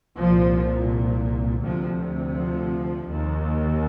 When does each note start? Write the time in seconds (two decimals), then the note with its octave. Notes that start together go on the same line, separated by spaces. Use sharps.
0.17 C2 A#2 F3
1.62 D2 C3 F3
2.35 F3
3.07 D#2